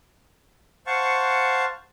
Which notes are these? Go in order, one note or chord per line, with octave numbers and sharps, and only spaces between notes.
C5 F5 F#5 A5 C#6